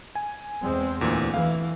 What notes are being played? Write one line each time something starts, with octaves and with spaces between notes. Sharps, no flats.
G#5
E2 G#3 C4
D2 A#2 E3
E3 F5